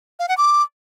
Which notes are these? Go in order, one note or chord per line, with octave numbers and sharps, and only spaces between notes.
F5
F#5
D6